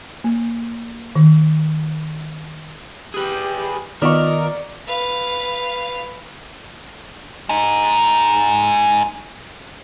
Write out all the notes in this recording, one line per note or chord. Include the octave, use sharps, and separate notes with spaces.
A#3
D#3
G4 G#4 B4
D#3 B3 F4 A#4 D5 D#5 C#6
B4 F5
G#3 D#4